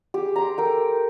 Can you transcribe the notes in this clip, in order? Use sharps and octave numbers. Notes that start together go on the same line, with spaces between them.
G4 G#4
A#5 C6
A4 A#4 G5